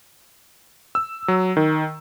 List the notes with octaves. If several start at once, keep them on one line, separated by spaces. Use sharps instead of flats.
E6
F#3
D#3